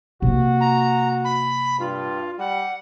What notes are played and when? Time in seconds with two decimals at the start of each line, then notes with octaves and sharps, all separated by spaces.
0.22 C3 A#3 F#4
0.60 A#5
1.24 B5
1.80 G2 F4
2.39 G3 F#5